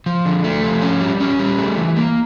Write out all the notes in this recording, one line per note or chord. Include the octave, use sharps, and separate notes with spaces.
F3
D3
A3
F3
C#4
G3
C#4
G3
A3
E3
A#3